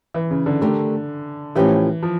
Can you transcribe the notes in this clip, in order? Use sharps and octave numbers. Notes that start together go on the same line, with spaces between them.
E3
C#3
D3
D3 A3 D4 G4 A#4
A2 E3 F3 C#4 G4 A#4
F3